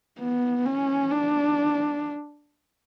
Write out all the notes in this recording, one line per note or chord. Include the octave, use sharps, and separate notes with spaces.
B3
C#4
D4